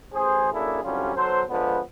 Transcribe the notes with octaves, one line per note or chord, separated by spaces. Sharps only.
A1 G#4 C5
F#2 A#3 D4 E4 G#4 A4
C2 D3 F#3 G3 C#4 F4
B1 F#3 A4 C5
D3 F3 G#3 B3